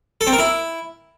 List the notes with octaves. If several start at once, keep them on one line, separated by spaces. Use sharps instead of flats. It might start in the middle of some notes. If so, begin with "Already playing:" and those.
A4
C4
A#4
E4